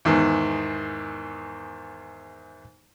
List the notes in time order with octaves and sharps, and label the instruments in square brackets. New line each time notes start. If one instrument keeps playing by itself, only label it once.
[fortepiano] E2 G#2 D#3